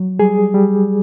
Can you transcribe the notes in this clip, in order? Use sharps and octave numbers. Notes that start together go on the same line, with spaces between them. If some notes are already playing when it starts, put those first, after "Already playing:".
Already playing: F#3
G3 G#4
G3